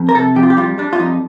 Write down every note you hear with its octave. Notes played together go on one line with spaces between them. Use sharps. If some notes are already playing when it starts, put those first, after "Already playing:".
Already playing: F2
A#4
C3 A4
F2 G4
F4
G4
G3 F4
G3 D4
F4
F2 D#4